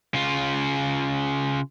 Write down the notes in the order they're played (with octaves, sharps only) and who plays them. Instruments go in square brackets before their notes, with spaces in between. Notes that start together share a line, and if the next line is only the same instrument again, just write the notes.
[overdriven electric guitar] C#3 F4